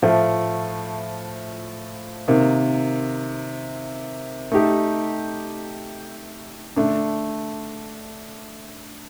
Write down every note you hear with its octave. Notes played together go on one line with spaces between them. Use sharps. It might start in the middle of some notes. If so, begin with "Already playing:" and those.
A2 F3 A3
C3 D#3 A#3
A3 D#4 G4
D3 A3 D4